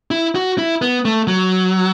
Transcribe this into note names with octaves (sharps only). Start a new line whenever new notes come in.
E4
F#4
E4
B3
A3
F#3